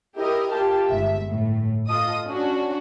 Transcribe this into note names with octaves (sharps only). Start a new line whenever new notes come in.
E4 G4 A#4 D#5
F4 G4 A5
G1 G#2 E5
A2
F4 A4 D#5 D#6
C#4 D4 F#4